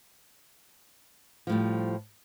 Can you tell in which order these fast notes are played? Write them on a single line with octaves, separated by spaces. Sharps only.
F3 A2 G3